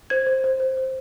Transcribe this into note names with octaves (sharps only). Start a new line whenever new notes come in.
C5 G#6
C5
C5
C5
C5